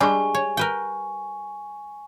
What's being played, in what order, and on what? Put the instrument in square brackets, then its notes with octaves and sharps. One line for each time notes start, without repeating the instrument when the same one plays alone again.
[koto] G3 G#3 D4 [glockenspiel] G#5 C#6
[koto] C#5
A#4 B4 G5